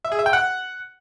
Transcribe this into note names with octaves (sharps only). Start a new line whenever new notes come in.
E5
G#4
E5
G5
F#5